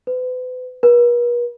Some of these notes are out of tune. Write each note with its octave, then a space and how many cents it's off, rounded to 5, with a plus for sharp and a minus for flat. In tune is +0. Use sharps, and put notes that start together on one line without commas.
B4 +40
B4 -45